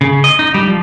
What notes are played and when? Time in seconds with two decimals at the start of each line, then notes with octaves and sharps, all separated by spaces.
0.01 C#3
0.24 D#5
0.39 D#4
0.54 G3
0.67 F3